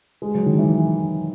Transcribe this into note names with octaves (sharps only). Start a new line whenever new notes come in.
G#3
F#3
D#3
E3